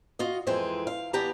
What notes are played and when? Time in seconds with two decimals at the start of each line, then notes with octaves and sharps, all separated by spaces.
0.19 F4 F#4 D#5
0.47 F2 E3 G#3 C4 G#5
0.87 F5
1.13 E3 G3 B3 G4 A5 A#5